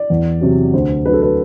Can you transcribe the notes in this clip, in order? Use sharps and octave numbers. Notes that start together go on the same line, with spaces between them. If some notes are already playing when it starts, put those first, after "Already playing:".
Already playing: D5
E2
C3 F#3
D2 C5
D3 F#3 B4
A4
B4